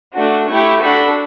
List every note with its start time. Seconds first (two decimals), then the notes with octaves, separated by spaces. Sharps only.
0.16 A3 D4 F#4
0.50 A3 E4 G4 C#6
0.82 D4 F#4 A4 B5